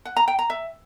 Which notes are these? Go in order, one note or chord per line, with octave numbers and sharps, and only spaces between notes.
F#5
A#5
G5
A#5
E5